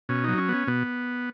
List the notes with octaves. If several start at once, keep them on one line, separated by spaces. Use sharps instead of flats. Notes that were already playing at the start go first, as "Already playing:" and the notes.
B2 C#4
F#3 D#4
C#4
B3 C#4
B2 B3